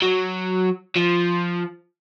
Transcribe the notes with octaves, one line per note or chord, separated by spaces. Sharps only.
F#3
F3